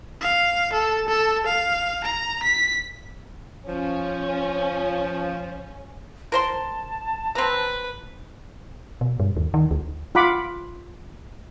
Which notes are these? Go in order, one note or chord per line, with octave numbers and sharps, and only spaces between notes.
F5
A4
A4
F5
A#5
B6
F3 C#4
A#4 C5 A5 C6
C4 B4 A#5
B2
G2
D#2
D#3
D2
F4 F#5 B5 D6